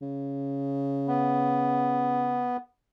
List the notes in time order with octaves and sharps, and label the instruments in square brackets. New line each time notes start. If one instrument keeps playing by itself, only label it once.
[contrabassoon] C#3
[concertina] B3